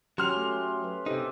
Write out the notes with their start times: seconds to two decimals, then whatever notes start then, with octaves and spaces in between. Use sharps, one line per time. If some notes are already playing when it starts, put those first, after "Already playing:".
0.18 F#3 C#4 G4 C6 F6 F7
0.37 A3
0.84 B4
1.06 C3 D#4 G4 A4 C5